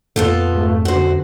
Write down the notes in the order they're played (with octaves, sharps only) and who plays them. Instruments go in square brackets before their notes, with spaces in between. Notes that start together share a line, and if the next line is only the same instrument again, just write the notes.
[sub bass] F2 [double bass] A#2 [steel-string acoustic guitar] B3 F4 A4
[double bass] G#2 A3
[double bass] F#2 D3 [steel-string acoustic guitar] F#4 C5